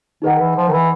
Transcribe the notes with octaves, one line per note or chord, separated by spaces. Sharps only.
D#3 D#4 G#4 B4 D#5 F#5
E3
F3
D#3
E3